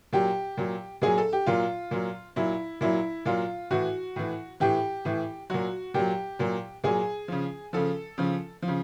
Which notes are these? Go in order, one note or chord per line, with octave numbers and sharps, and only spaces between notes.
A#2 F#3 G4
A#2 F#3
A#2 F#3 G#4
A4
G4
A#2 F#3 F4
A#2 F#3
A#2 F#3 E4
A#2 F#3 E4
A#2 F#3 F4
A2 E3 F#4
A2 E3
A2 E3 G4
A2 E3
A#2 F#3 F#4
A#2 F#3 G4
A#2 F#3
A#2 F#3 G#4
C#3 F3
C#3 F3 A4
C#3 F3
F3
C#3